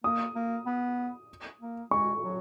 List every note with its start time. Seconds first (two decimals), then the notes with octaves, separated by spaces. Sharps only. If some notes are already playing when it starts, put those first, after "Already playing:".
0.04 A#3 D#6
0.35 A#3
0.66 B3
1.61 A#3
1.91 G#3 C#6
2.23 F#3